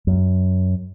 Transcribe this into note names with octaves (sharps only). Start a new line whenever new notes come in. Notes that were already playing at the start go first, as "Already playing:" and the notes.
F#2